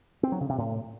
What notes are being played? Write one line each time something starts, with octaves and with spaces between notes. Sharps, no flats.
C4
F#3
C#3
C3
A2